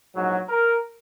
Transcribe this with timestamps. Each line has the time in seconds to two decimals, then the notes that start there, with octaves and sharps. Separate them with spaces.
0.15 A#1 G#2 F#3
0.49 A#4